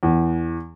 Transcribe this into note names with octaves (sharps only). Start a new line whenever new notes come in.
E2